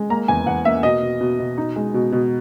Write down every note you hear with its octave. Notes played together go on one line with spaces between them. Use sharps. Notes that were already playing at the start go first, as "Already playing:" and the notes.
Already playing: G#3
A#3 A#5
E2 G#5
E2 F#5
A#3 E5
B2 D#5
B2
B2
B2
D#4
G#3
B2
B2